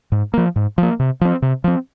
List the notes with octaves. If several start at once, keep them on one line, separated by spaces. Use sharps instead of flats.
G#2
F3 A#3
G#2
F3 A#3
C3
F3 C4
C3
F3 C4